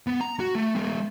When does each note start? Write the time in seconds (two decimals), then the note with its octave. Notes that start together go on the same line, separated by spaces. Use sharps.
0.07 B3
0.21 A#5
0.40 F#4
0.55 A3
0.75 G#3 B3